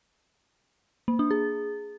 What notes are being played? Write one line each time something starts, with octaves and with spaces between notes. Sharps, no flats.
A#3
D4
G#4